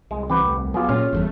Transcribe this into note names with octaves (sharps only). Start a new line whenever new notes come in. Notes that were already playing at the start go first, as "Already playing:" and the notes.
C2 G#3
D3 E3 C4 G4 B4 F#5
D#2 A3
F#3 B3 F4 G4 G#4
A#2 C#4 F4 C#5 F6
G1 E2 G2 A3